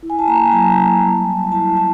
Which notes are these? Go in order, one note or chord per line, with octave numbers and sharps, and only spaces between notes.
E4
G#5
A5
A#3 A#5
G#5
F#3 A5
F#3
G3
G3
E4 A5
E4 A5